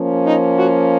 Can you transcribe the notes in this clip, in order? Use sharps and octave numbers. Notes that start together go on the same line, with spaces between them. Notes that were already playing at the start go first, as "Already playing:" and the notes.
Already playing: F3 A#3 C#4
D#4
F#4